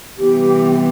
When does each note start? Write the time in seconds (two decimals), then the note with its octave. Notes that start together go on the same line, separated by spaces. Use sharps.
0.18 C3 E3 G3 B3 G4